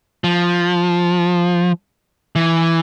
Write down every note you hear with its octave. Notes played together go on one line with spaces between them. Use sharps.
F3
E3